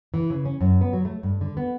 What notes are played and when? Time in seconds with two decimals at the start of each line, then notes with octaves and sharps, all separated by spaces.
0.14 E3
0.30 C#3
0.45 C#4
0.61 F#2
0.81 B3
0.93 F#3
1.05 A3
1.23 G2
1.41 D3
1.57 B3